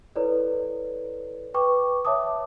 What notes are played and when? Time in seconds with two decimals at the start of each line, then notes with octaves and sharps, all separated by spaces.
0.16 E4 A4 B4 C#5 D5
1.54 B4 G5 C#6 D6
2.05 C#5 E5 A5 D6 D#6